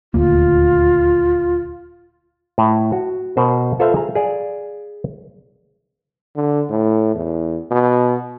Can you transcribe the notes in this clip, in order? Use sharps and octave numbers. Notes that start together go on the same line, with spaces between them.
D#1 D2 A#3 F4
A2
F#4
B2 A#4 C5
F4 A4 B4 C5 E5 F5
G#4 A#5
G#4 D5 F5
D3
A2
E2
B2